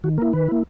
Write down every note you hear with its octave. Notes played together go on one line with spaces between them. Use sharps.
D#3 F#4
A#3 E4 A#4
D#3 B4
A#3 E4